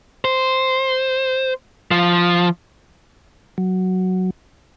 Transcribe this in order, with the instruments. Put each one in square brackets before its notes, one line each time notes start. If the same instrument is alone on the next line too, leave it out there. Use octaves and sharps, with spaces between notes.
[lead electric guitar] C5
F3
[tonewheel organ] F#3